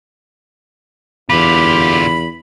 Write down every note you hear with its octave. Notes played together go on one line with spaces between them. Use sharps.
E2 D3 F4 G4 B5